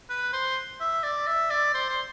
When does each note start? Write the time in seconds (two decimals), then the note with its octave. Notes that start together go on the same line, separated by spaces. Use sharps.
0.10 B4
0.33 C5
0.80 E5
1.03 D5
1.27 E5
1.50 D5
1.74 C5
1.89 C5